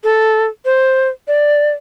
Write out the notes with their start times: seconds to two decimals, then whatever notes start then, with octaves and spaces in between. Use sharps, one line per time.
0.04 A4
0.65 C5
1.28 D5